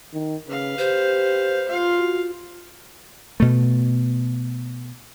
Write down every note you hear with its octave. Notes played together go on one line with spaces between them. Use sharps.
D#3
C#3 B4 F5
G4 C5
F4 F5
F#4
B2 A3